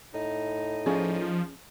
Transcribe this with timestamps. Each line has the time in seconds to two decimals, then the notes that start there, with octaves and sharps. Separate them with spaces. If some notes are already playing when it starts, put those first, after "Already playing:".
0.14 A2 D#4
0.86 F3 C#4 G#4 D5